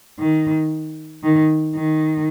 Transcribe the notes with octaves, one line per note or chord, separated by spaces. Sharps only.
D#3
D#3
D#3